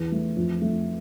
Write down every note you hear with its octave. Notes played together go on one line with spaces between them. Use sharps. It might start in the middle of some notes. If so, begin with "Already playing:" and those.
Already playing: E2
A3
F2
A3